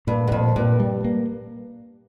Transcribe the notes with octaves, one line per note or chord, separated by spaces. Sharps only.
G2 A#2
G2
F2 A#2
G2 A#2
G3
A#3